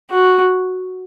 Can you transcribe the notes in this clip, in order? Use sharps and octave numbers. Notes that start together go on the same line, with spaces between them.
F#4